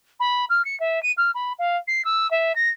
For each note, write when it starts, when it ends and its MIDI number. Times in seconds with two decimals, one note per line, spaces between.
0.20 0.45 83
0.49 0.62 89
0.65 0.78 97
0.80 1.02 76
1.02 1.12 99
1.17 1.31 89
1.34 1.52 83
1.59 1.77 77
1.87 2.04 96
2.04 2.30 88
2.30 2.55 76
2.55 2.69 94